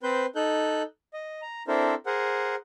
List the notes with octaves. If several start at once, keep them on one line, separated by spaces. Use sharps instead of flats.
C4 B4 C5 G6
D#4 A4 F#6 G6
D#5
A#5
C4 D4 E4 A4 A#4 C5
G#4 A#4 C5 F#5